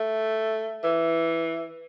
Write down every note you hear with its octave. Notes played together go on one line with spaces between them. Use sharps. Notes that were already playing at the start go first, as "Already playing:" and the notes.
Already playing: A3
E3